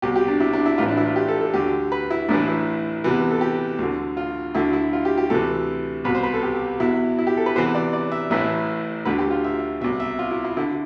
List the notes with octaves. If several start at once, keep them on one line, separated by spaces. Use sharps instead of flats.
C2 B2 G4
G4
D4
E4
D4
E4
A1 A2 E3 F4
D4
E4
F4
G4
A4
A4
D2 D3 G4
B4
E4
A1 A2 E3 D4
E4
E2 C3 E3
A4
G4
D2 D3
F4
D2 D3 E4
E4
F4
G4
G4
D2 C3 E3 A4
C2 B2 B4
C5
B4
A4
G4
E2 B2 E4
E4
G4
A4
B4
E2 C3 E3 C5
D5
D5
E5
A1 A2 E3 E5
D2 D3 B4
G4
F4
E5
C2 B2 E5
E5
F4
E4
E4
D3 E4